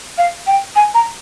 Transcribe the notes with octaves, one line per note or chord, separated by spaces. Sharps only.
F5
G5
G#5
A#5